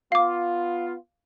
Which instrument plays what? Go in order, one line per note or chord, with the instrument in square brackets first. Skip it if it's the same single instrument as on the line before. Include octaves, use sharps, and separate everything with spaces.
[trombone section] B3 F4 [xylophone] F5 D6